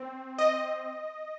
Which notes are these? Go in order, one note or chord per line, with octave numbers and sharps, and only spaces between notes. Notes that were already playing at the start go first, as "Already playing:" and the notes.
Already playing: C4
D#5